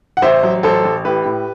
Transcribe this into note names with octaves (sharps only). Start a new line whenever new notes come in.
F#5
A1 C5 E5
F#3
A1 A4 C5
A1
A2 G4 B4
A2